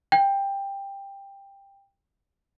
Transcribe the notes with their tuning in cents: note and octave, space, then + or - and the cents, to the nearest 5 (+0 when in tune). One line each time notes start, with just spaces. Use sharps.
G5 +15